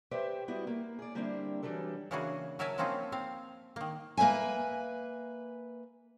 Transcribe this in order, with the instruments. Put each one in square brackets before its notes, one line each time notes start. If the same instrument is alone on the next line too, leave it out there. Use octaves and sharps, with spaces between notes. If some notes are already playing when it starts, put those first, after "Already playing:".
[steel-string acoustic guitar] G4 B4 C5 D5 E5 G5
G3 B3 E4 F#4 G4
A#3
G#4 D5
D3 G3 A#3 C4 D4 E4
E3 F#3 G3 D4 A4
[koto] C#3 E3 A#3 D4 F#4 G#4
F#3 A#4 E5 G#5 A5
F3 A#3 C4 C#4 D#4 F4
C4 F5
D#3 A#3
[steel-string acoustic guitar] A#3 B4 C5 E5 G#5